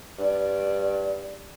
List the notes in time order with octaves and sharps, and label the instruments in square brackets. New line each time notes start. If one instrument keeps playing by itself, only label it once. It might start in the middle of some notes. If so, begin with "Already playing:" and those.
[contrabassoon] G2 [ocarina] D5